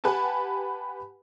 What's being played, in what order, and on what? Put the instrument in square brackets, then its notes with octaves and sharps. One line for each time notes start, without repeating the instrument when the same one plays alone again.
[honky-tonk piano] G4 B4 F#5 G#5 A5